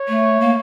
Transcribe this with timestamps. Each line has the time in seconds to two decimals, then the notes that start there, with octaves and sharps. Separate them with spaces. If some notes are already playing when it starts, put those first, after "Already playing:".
Already playing: C#5
0.08 A3
0.40 A#3